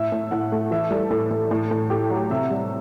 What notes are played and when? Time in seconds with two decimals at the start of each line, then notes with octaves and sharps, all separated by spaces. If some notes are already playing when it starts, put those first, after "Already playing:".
Already playing: A2 E5
0.12 A2
0.31 A2 F#5
0.52 A3
0.71 E3 E5
0.91 G3 A4
1.10 A2 A4
1.31 A2
1.51 A2
1.71 A2
1.90 A3 G4
2.10 F#3
2.30 C3 E5
2.50 G3